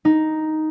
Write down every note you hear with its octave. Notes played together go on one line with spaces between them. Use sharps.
D#4